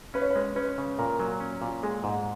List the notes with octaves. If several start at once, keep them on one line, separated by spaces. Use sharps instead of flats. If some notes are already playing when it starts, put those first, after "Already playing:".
C#4 B4
C#5
B4
G#3
C#4 B4
C#3
A#2 A#4
F#3
C#4
A#2
G#3 G#4
G#2